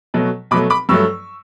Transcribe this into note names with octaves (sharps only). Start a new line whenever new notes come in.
B2 F#3 A3
B2 F#3 A3 B5 D6
B5 D6
G2 F#3 A3 C#6 E6